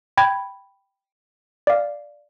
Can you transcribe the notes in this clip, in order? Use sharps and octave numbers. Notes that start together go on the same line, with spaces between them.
G5 B5 G#6
D5 F5